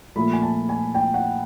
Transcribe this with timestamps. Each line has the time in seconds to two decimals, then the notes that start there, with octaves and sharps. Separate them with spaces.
0.16 A#2 F3 A3 B5
0.33 G#5
0.42 A5
0.69 G#5
0.95 G5
1.14 F#5